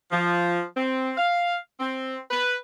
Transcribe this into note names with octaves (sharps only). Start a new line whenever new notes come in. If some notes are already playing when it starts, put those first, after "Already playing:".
F3
C4
F5
C4
B4